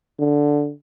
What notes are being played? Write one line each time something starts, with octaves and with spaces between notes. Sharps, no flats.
D3